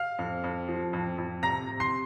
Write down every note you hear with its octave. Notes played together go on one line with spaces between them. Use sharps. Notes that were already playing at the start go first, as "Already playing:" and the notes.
Already playing: F5 F6
F2
F2
F3
F2
F2
C3 A#5 A#6
C3
C6 C7